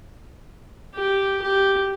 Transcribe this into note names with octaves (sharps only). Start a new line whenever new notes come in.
G4
G4